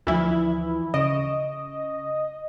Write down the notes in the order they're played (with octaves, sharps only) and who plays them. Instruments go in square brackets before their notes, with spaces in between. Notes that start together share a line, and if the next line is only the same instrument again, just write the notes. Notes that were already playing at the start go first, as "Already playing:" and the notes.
[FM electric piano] D2 F3 [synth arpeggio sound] E3 E4
[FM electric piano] C#3 [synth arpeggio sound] D#5